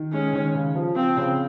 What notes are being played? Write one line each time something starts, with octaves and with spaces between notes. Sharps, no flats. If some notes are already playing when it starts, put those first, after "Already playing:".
Already playing: D#3
G#3 C#4
D#3
C#3
F3
F3 C4
C#3